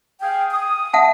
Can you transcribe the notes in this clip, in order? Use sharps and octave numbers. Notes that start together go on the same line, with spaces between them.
G#4 F5 G5
D#6
E5 F#5 A5